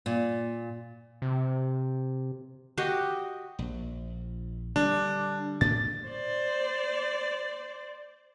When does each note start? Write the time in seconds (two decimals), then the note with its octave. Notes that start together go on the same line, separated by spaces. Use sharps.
0.06 A#2
1.22 C3
2.78 F#4 G4 D#5
3.59 A#1
4.76 D3 G3 D4
5.61 A2 D4 A6
6.09 C5 D5